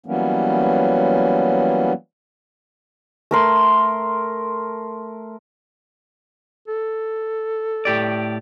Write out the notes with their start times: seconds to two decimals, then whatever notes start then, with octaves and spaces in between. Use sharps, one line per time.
0.06 E3 F#3 G3 A#3 B3 C#4
3.31 A3 A#4 C6
6.68 A4
7.85 A2 G4 D5